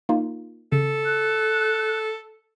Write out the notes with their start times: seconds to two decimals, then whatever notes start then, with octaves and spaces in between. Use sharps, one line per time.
0.09 A#3 D#4 F4
0.72 C#3 A4
1.05 F#6